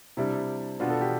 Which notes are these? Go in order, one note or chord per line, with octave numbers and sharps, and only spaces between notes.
C3 G3 D4 E4
B2 B3 D4 F4
A4
G4